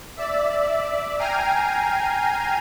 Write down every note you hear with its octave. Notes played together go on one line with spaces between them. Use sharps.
D5 E5
G5 G#5 A#5 F6 C7 D#7